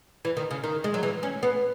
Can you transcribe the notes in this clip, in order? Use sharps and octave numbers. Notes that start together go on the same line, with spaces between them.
E3
D#3
C#3
D#3
G#3
F#3
E3
C#4
B3